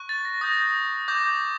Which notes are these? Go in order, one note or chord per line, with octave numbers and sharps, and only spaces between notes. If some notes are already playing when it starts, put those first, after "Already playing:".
Already playing: C#6 F#6
A6
A#6
D#6 G6 A#6
D6 G6 A#6